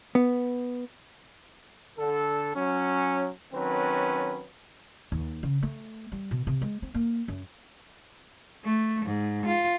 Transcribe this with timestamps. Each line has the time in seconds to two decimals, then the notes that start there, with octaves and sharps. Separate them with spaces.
0.15 B3
1.99 D3 A4
2.55 F#3 C#4
3.53 D#3 F#3 C4 C#4 B4
5.12 D#2
5.43 C#3
5.63 A3
6.12 G3
6.31 B2
6.47 C3
6.62 G#3
6.82 C4
6.94 A#3
7.28 F#2
8.65 A3
9.05 G#2
9.46 F4